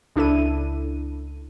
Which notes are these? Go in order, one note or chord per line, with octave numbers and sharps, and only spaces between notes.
C#2 D4 E4 A4 D#7